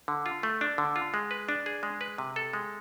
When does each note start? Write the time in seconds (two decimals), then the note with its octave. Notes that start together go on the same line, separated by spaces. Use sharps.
0.08 D3
0.26 F4
0.43 A3
0.61 D4
0.78 D3
0.96 F4
1.14 G#3
1.31 B4
1.49 D4
1.66 G#4
1.83 G#3
2.01 B4
2.18 C3
2.36 A4
2.53 G#3